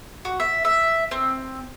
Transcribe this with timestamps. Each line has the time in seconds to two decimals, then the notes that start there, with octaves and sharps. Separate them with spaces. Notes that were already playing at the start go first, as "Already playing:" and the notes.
0.25 F#4
0.40 E5
0.65 E5
1.11 C4